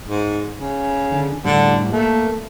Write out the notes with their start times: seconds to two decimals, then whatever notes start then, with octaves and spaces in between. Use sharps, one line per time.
0.08 G#2
0.59 C#3
1.12 D3
1.45 A2 D3 G3
1.93 A3 A#3